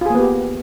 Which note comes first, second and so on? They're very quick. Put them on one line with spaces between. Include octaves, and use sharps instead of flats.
F4 G#4 A#3 B3 G4